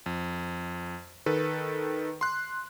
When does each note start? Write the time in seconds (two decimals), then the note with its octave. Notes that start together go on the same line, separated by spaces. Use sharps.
0.06 F2
1.26 D#3 A4 B4
2.21 C6 F#6